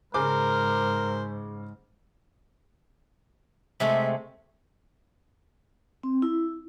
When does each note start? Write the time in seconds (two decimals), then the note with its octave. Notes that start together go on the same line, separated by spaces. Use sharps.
0.14 G#2 C#3 A#4 C5 G#5 D6
3.80 C3 G#3 A3 E5
6.03 C4
6.22 E4